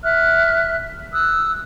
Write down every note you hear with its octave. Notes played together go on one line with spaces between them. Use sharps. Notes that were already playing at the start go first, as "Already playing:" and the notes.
E5 F6 F#6
D#6 E6 F#6